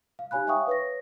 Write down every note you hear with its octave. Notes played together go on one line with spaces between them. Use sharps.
F5
D#4 G4 C#5 G#5 B5 F#6
C#5 E5 F5 G5 C#6 D#6
B4 C#5 A#6